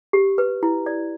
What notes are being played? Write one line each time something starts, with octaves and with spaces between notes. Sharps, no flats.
G4
B4
E4
D5